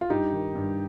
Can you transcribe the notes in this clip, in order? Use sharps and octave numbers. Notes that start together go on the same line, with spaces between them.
F4
G2 D#4 G4
D#3
G2